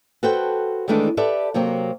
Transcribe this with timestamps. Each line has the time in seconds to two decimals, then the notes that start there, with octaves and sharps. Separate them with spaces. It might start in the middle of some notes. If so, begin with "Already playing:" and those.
0.23 F#4 A4 B4 C5 G5
0.88 D#3 E3 G#3 A3 D4 E4
1.17 G4 A4 B4 D5 E5
1.54 C3 F#3 A#3 C4